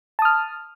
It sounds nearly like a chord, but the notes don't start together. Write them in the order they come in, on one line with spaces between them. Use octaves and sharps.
A5 D#6 F6